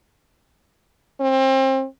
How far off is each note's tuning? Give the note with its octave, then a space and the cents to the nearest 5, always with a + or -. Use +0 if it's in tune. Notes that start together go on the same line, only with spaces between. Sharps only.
C4 +30